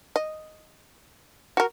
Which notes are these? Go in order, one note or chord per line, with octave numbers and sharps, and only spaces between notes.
D#5
F#4 A#4